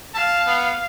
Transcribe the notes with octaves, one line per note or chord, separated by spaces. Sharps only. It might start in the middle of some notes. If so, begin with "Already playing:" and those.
F5 A5
B3